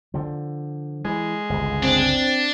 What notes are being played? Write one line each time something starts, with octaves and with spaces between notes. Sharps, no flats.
D3 F3
E3 G#3
G1 C#2
C4 D4